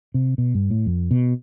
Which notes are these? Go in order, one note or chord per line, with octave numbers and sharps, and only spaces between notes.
C3
B2
G2
A2
F2
B2